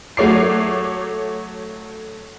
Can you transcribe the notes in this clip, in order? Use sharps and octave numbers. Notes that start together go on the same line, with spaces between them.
F#3 A3 C#5 D6 C7